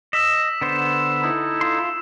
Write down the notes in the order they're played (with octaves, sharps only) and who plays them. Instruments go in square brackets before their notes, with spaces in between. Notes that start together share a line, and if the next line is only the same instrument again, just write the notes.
[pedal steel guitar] D#5 [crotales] E6 B6 E7
[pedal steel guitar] D3 B3 C5
[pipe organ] D#4 E4 A4
[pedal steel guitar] F4 C6